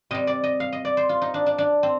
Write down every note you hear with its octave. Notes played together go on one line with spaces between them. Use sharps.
C3 G3 D#5
D5
D#5
F5
D#5
D5
C5
F4
D#4
D4
D4
D4
C4